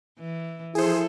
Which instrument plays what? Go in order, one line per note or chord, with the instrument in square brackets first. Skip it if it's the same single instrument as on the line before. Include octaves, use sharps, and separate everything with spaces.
[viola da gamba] E3
[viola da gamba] F3 A4 [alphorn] E4 [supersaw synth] G#4 C5